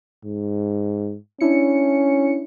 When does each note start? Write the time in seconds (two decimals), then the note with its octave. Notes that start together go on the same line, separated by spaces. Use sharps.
0.24 G#2
1.40 C#4 D4 E4 C#7